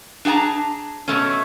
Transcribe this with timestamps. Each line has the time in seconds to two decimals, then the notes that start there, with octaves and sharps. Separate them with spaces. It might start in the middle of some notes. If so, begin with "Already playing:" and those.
0.25 D4 G#4 F#5 A5 A#5
1.08 B2 A3 C#4